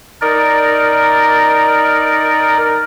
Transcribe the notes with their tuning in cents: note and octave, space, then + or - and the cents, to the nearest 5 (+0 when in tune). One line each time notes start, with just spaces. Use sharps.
D#4 +0 A#4 +0 D5 +0